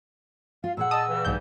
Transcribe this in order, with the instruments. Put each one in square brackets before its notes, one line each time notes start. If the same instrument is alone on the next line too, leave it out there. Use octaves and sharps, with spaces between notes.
[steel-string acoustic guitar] F4 [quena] F5
[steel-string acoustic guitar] A#2 G#4 F#5 [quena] E6
[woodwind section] D#5 A5 [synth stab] D#6
[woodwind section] G2 C#3 E3
[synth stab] B1 G#2 G6